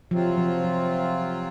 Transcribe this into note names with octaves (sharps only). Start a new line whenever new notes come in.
C3 F3 F#3 C4 F4
F3
F3